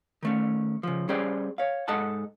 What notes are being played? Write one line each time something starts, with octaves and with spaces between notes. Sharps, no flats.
D#3 A3 C#4
C#3 F3
G3 C#4 G#4 C5 D5 G5
C#5 F5
G#2 A4 D#5 F#5 A5